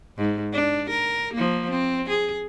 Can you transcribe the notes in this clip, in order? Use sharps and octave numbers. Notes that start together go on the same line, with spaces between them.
G#2
D4
A#4
F3 A#3
C4
G#4